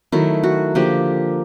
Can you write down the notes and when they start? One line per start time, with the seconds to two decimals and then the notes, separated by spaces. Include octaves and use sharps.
0.12 D#3 F#3 A3 E4
0.43 F#4
0.75 D3 F3 A#3 G4